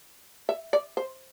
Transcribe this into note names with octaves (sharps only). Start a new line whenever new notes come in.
E5
D5
C5